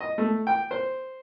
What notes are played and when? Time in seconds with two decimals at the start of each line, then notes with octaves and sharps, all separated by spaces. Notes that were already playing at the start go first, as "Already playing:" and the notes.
0.01 D#5
0.18 A3
0.47 G5
0.71 C5